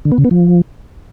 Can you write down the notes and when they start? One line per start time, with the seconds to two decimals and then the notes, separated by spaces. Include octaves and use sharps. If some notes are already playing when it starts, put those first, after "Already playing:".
0.05 D3
0.12 B3
0.18 C#3
0.24 B3
0.31 F3